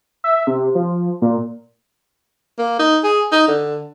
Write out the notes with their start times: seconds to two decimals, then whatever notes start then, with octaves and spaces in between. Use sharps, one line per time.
0.24 E5
0.47 C3
0.75 F3
1.22 A#2
2.58 A#3
2.79 D#4
3.04 G#4
3.32 D#4
3.48 D3